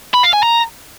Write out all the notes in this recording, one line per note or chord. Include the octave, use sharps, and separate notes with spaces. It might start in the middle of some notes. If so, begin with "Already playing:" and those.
B5
F5
G#5
A#5